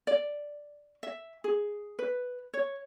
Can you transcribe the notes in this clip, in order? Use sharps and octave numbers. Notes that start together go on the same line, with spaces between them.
D5
E5
G#4
B4
C#5